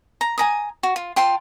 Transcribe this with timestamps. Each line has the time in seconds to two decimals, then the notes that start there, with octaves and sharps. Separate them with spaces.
0.21 A#5
0.38 G#5 A#5 D#6
0.83 F#4
0.96 F4
1.16 F4 G5 A5 C6